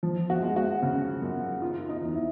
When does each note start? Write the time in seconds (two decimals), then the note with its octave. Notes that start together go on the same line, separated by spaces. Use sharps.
0.03 F3
0.30 F#4
0.42 G#3
0.56 F#4
0.82 C#3
1.22 F#2
1.62 D#3 F4
1.89 D#4
2.02 E2
2.15 E4